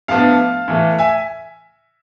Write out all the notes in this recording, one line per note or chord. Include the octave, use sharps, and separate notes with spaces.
A2 F3 B3 D4 F5 A5
A2 E3 A3
E5 G#5